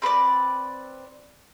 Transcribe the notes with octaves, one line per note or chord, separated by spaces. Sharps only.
C4 B4 C5 D5